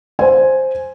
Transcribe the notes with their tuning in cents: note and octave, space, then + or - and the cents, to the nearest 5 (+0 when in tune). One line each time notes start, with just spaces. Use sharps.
C5 +5 G#5 +0